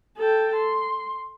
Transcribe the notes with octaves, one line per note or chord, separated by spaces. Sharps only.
A4 G5
C6